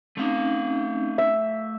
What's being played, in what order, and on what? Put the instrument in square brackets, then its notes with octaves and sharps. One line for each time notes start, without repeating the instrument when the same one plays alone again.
[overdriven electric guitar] A3 F5 [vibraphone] C4 C#4 D#4
[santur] E5